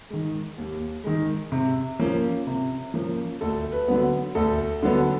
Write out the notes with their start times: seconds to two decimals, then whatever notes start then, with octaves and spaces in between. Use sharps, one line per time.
0.10 D#3 G#3
0.58 D#2
1.04 D#3 G#3
1.52 C3
1.99 F3 A#3 C#4
2.47 C3
2.94 F3 A#3 C#4
3.41 D2 A4
3.72 B4
3.88 D3 F#3 B3
4.35 D2 A4
4.83 D3 F#3 B3